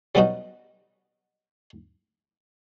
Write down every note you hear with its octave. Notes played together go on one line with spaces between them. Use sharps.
F#3 G3 B3 C#4 D#4 F#4